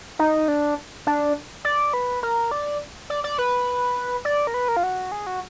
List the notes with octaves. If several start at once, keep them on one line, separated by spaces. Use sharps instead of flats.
D#4
D4
D4
D5
B4
A#4
D5
D5
D5
B4
D5
A#4
B4
A#4
F4
F#4
G#4
F#4